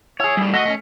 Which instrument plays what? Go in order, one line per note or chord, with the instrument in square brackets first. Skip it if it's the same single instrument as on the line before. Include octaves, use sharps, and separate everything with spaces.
[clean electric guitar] E4 G#4 [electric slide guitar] C#5
[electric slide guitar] A2 G3
[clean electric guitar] A3 F#4 [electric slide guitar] D#5
[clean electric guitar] A3 C4 C#4